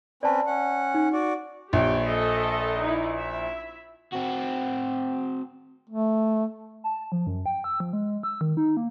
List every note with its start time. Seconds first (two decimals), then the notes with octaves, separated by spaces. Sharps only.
0.23 C4 C#4 B4 D5 A5
0.46 C#4 F#5
0.94 D#4
1.13 F#4 D5
1.73 A#1 G4 C#5 G5
2.05 A4 D#5 E5
2.81 D#4 E4
3.16 E4 E5
4.12 C4 F#4
5.90 A3
6.84 A5
7.12 F3
7.27 F#2
7.46 G5
7.64 E6
7.80 F3
7.93 G#3
8.23 E6
8.41 D#3
8.57 D#4
8.77 A#3